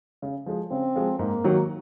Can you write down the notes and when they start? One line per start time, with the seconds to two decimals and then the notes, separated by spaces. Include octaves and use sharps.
0.22 C#3
0.46 F3 G#3
0.71 C#3 C4
0.96 F3 G#3
1.19 G#2 A#3
1.44 D#3 F#3